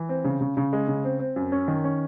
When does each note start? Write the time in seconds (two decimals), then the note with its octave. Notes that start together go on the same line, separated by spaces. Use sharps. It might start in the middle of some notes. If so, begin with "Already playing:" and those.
Already playing: E3
0.09 C4
0.24 C#3
0.41 C#3
0.57 C#3
0.73 G#3
0.88 C#3
1.04 C4
1.20 C4
1.36 F#2
1.52 C#4
1.68 D#3
1.84 C#4